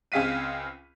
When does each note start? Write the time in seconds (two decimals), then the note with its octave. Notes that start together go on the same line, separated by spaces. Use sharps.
0.12 C#2 C4 G#4 F5 B6 D#7